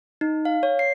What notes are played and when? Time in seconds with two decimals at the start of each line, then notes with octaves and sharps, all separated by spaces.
0.21 D#4
0.45 F5
0.63 C#5
0.79 C7